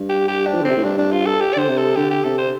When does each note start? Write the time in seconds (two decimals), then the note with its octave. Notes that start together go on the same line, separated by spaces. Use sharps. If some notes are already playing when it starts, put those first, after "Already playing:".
Already playing: G2
0.09 G4
0.28 G4
0.47 D4
0.54 F3
0.61 D3
0.65 C3 C4
0.76 A2
0.84 G2 D4
0.98 D4
1.12 F4
1.26 A4
1.41 G4
1.54 D5
1.57 D3 C5
1.68 C3
1.78 A4
1.96 D3 G4
2.10 G4
2.24 C3 A4
2.38 C5